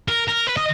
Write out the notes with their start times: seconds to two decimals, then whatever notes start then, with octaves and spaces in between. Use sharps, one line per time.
0.08 A#4
0.28 A#4
0.47 B4
0.57 D#5